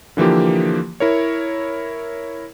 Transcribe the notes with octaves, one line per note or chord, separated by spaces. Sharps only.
D3 E3 F3 A#3 G4
E4 A#4 C#5